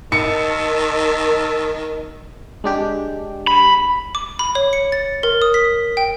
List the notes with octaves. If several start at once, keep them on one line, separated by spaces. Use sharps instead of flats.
D#3 A#4 A5 E6 C#7
G#3 D4 G4
B5
D6
B5
C#5
C#7
A6
A#4
D#6
B6
G5